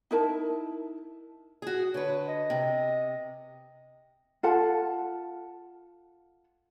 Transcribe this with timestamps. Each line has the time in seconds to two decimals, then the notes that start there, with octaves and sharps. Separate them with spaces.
0.11 D#4 E4 A#4 A5
1.62 F#4 G#4
1.94 D3 B4 C#5
2.27 D#5
2.50 C3
4.43 F4 A4 F#5 A5